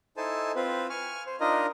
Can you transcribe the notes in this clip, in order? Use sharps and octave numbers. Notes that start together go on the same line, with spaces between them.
D#4 E4 A4 C5 G#5 A5
C4 F4 B4 C5
G#5 C#6 F6
C5
D4 D#4 F4 A#4 D#5